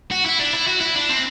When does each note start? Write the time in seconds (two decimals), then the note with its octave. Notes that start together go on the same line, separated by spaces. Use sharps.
0.11 F#4
0.25 E4
0.39 D4
0.53 E4
0.67 F#4
0.81 E4
0.95 D4
1.09 C4